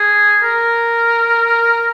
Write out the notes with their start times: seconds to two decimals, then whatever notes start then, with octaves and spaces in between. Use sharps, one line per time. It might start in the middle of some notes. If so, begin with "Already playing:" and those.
Already playing: G#4
0.43 A#4